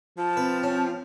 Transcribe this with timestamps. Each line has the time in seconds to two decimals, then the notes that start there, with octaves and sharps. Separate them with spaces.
0.18 F3 A5
0.37 C4 B4
0.63 C#4